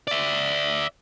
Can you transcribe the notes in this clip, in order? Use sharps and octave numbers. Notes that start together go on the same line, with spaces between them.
D5 E5